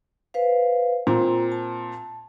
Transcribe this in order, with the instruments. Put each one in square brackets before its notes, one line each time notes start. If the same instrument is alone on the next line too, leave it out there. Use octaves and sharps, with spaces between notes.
[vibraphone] B4 C5 F5
[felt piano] A#2 C4 [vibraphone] F4 A#5
[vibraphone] A5